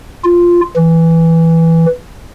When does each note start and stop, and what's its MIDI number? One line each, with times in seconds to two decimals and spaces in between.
0.24 0.61 65
0.76 1.86 52